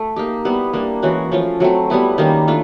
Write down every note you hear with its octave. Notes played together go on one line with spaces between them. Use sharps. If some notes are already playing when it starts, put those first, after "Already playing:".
Already playing: A3
A#3 D#4 G4
G3 B3 E4
G3 A#3 D4
E3 G#3 C#4 F#4
F3 A3 C#4 F4
F#3 A3 C4
G3 B3 E4
D#3 G3 A#3 C#4
A3 D4 F4